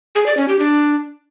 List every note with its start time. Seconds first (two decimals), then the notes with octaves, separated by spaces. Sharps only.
0.15 G#4
0.26 D5
0.37 C#4
0.48 G4
0.59 D4